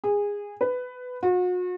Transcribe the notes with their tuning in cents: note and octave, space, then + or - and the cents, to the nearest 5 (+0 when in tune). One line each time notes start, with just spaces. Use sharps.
G#4 -20
B4 +15
F#4 -40